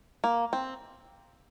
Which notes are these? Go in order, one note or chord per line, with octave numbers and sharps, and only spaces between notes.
A#3
C4